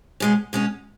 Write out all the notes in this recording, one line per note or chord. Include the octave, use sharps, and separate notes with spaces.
B2 G#3 C#4
B2 G#3 C#4